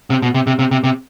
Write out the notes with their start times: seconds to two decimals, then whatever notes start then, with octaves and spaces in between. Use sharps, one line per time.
0.10 C3
0.23 B2
0.34 C3
0.47 C3
0.59 C3
0.71 C3
0.84 C3